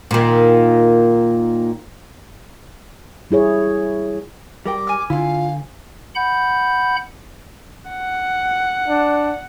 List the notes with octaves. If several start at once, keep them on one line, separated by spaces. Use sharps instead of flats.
A#2 D#3
G3 E4 G#4 C#5
G3 A#4 G5 D6
G#5 F6
D3 E4 F4 F5
F#5 B5 G6
F#5
D4